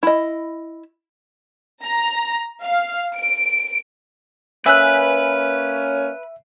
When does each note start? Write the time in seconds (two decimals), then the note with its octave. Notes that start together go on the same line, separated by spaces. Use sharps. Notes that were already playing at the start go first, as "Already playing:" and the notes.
0.03 E4 D#5
1.83 A#5
2.63 F5
3.15 D7
4.66 A#3 C#4 B4 E5 G#5 E6 F#6